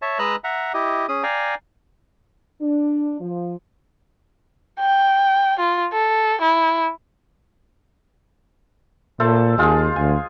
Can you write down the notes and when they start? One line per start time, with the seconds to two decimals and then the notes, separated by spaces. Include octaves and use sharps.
0.02 C#5 E5 A5
0.19 G#3 B4 D#5 A#5 E6 F#6
0.44 E5 F#5 A#5
0.74 E4 G4 D#5
1.09 C#4 G#4 D#6
1.23 D5 F5 G5 G#5 A#5
2.61 D4
3.21 F3
4.80 G5
5.59 F4
5.93 A4
6.41 E4
9.20 A#2 A3 A4 C5
9.58 D#2 G#3 F4 G#4
9.96 D2 G#5